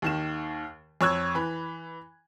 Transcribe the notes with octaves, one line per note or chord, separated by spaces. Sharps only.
D#2 D#3 E7
F2 C#5 E6 F#6 G#6
E3 B5